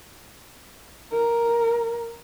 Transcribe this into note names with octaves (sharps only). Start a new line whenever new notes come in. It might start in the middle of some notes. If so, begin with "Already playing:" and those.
A#4